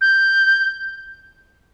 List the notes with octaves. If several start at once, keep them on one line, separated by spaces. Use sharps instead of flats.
G6